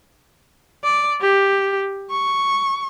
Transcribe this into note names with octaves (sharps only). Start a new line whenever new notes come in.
D5
G4
C#6